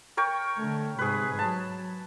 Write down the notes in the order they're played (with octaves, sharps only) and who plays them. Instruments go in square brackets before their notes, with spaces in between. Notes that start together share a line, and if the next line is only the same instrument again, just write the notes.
[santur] A#4 C#5 G5
[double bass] D3 A3
[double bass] G#2 C3 [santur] G#4 B4
[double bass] F#3 [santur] A5